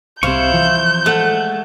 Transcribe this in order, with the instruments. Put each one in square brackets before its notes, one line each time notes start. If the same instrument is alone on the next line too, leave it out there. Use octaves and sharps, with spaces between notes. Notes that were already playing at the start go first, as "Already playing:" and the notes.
[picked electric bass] C2 C3 [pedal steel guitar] E4 F5 C#6 [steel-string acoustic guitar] C5 [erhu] G6
[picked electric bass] E3 F3
[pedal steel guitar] G#3 A4 F#5 [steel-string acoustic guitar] A3